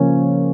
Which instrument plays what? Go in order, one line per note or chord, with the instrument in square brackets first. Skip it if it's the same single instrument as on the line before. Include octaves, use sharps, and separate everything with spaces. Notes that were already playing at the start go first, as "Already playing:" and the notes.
Already playing: [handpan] C#3 F3 A#3 C#4